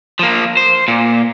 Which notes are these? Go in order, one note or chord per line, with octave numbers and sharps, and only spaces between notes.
F3 A#3
C5
A#2